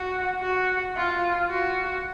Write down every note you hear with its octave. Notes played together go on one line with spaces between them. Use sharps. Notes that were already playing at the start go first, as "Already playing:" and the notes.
Already playing: F#4
F#4
F4
F#4